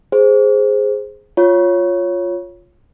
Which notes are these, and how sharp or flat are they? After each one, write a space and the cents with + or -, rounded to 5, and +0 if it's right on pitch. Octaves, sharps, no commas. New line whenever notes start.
G#4 +0 C5 +0
F4 +5 C#5 +0